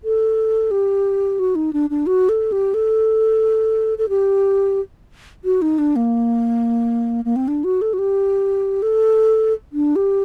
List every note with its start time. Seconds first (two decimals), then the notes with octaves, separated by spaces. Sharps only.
0.04 A4
0.71 G4
1.39 F#4
1.55 D#4
1.73 D4
1.90 D4
2.06 F#4
2.29 A4
2.52 G4
2.74 A4
3.98 A4
4.09 G4
5.44 F#4
5.62 D#4
5.78 D4
5.96 A#3
7.25 A#3
7.36 C4
7.48 D4
7.64 F#4
7.82 A4
7.93 F#4
7.99 G4
8.82 A4
9.73 D4
9.96 G4